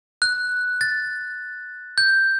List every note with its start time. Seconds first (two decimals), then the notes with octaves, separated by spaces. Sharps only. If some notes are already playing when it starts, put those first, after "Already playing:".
0.22 F#6
0.81 A6
1.98 G6